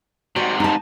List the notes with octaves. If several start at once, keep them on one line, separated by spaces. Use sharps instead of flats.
G#2 C3 F#4 D5
D#4 A5